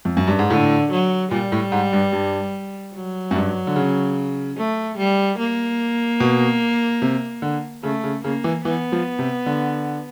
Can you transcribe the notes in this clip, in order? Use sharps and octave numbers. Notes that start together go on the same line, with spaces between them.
F2
F#2
G2
G#2
A2 D3
F#3
A#2 G3
A2
G#2
G2
G2
F#3
F#2
G2
D3
C#3
A3
G3
A#3
B2
C3
D3
C#3 A3
C#3
C#3 A#3
E3
E3 B3
F3
C3
D3